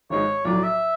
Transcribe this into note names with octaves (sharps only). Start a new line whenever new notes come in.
G#1 G#2 G#3 C#5
B1 A2 F#3 D5
E5